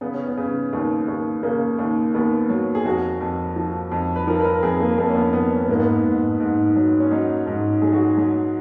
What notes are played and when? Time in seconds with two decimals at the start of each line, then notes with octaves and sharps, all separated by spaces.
0.01 C#3 B3
0.14 C#4
0.27 B3
0.37 C#3
0.73 D#2
1.08 D#2
1.43 C#3 A#3
1.79 D#2
2.14 D#2 B3
2.49 F#3
2.75 G#4
2.85 F2 F#4
3.21 F2
3.56 F3
3.92 F2
4.16 B4
4.27 F3 A#4
4.40 B4
4.45 A#4
4.63 F2 G#4
4.80 A#3
4.98 F2 A#3
5.10 C#4
5.16 B3
5.33 F2 B3
5.51 C#4
5.61 B3
5.69 G#2 A#3
5.80 B3
6.05 G#2
6.40 G#2
6.76 F#3
7.00 C#4
7.11 F#3 D#4
7.46 G#2
7.82 F#3 G#4
7.93 F#4
8.04 G#4
8.17 F#3